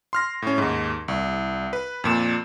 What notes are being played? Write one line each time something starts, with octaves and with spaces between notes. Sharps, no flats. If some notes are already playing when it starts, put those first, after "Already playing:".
C6 F6 A#6
A2 C#4
D#2 G#2
C2
B4
F2 A#2 E7